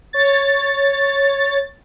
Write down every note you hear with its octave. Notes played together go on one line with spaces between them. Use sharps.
C#5 A6